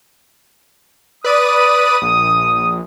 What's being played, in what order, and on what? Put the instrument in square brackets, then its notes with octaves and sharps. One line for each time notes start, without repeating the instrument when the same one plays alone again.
[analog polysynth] B4 D5 D#7 [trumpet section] D#6
[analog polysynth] A#1